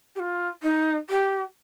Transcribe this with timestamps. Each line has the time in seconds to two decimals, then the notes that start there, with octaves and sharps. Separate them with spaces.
0.15 G4
0.19 F4
0.63 D#4
1.09 G4